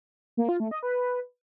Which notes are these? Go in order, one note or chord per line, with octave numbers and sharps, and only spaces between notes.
A#3
F4
A3
D#5
B4